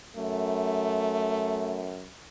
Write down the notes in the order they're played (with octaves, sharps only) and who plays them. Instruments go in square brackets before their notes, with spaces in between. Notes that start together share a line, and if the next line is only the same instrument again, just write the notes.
[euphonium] F#2 [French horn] A3